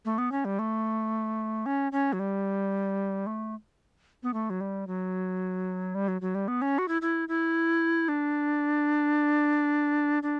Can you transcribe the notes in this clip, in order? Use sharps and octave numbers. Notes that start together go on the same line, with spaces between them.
A3
B3
C#4
G3
A3
C#4
C#4
F#3
G3
A3
B3
A3
F#3
G3
F#3
G3
F#3
F#3
G3
B3
C#4
F#4
E4
E4
E4
D4
D4